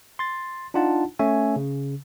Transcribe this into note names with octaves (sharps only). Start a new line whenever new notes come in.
C6 A6
D4 D#4 F4 F#5 A5
A3 C#4 C#5 E5 G#5
C#3